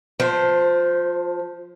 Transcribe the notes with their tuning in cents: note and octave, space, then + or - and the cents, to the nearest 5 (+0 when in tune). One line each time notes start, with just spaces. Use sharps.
F3 +20 C5 -10